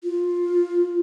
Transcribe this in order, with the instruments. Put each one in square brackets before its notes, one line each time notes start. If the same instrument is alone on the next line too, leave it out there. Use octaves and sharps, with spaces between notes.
[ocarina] F4